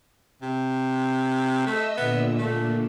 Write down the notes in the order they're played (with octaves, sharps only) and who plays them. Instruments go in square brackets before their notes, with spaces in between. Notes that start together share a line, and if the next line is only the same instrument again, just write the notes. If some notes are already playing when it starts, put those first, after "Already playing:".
[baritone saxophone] C3
[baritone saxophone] A3 [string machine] D#5 E5 E6
[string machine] A#2 D3 [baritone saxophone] B3
[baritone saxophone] A3